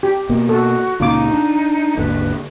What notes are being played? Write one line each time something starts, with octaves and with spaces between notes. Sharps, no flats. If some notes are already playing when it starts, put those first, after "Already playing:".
G4
B2 A#3
F#4 A4
C#2 A#2 C#3 D#4 F4 D6
D4
G#1 D#2 D3 B4